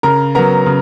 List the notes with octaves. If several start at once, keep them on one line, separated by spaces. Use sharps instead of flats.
C#3 A#4 A#5
F#3 B3 A#4 A#5
C#3